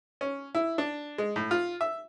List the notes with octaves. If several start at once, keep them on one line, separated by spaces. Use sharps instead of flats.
C#4
E4
D4
G#3
A2
F4
E5